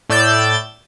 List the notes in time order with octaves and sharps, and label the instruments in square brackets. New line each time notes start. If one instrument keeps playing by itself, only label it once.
[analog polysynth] A2 D5 E6 G6 A6